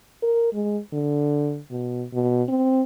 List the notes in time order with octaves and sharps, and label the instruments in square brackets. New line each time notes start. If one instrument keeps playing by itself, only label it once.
[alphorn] A#4
G#3
D3
B2
B2
C4